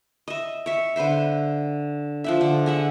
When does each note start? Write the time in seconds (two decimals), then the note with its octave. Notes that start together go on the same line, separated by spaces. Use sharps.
0.28 D#5 E5
0.66 C#5 E5
0.96 D3 B4 C5 E5
2.24 F3 D4 E5
2.41 D3
2.66 G#4 E5 F#5